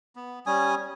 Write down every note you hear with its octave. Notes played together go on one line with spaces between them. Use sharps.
B3
G3 C#4 G#5 D#6